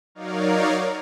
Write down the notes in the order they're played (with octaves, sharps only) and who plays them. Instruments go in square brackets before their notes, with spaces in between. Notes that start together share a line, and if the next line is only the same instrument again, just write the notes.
[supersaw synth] F#3 D#4 A#4 C#5 D5 F5